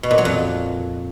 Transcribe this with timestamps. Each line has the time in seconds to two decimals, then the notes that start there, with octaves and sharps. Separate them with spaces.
0.03 B2
0.11 A#2
0.18 F#3
0.25 F2